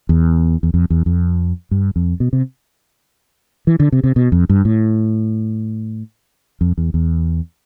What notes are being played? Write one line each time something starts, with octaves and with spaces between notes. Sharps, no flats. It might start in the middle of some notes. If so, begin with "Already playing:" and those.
E2
E2
F2
E2
F2
G2
F2
B2
C3
E3
D3
C3
C3
B2
F2
G2
A2
F2
E2
E2